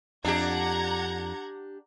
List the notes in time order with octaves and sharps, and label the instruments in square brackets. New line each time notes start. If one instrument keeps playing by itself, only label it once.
[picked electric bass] F2 [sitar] D4 G4 [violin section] F#5 A#5 G#6